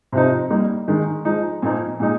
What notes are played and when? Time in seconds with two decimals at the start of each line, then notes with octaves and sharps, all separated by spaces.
0.12 C3 F3 C4 D#4
0.50 G3 A#3 D#4
0.87 D#3 G#3 D#4
1.25 F3 G#3 D#4
1.62 A#2 F3 A#3 D#4
2.00 A#2 G#3 D#4